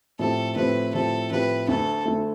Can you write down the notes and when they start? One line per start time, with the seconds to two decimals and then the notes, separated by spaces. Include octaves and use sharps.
0.19 A2 F3 C4 E4 G4 A4
0.56 A2 F3 C4 E4 G4 B4
0.94 A2 F3 C4 E4 G4 A4
1.31 A2 F3 C4 E4 G4 B4
1.68 D2 D3 A3 A4
2.05 D2 D3 A3